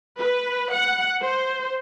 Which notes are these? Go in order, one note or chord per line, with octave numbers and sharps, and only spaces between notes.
B4
F#5
C5